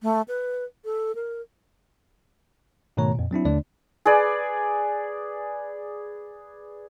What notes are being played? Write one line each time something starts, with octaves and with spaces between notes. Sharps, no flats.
A3
B4
A4
A#4
G#2 B2 D#3 A3 C#5 A#5
F2 A#2
F#3 C4 D4 E4
D#2 D3 A3 D4 D5
G#4 B4 D5